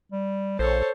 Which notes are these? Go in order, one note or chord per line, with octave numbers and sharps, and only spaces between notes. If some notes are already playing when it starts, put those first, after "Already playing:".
G3
A#1 A4 C5 C#5